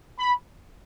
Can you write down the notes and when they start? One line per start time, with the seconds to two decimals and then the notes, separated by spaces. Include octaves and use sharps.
0.19 B5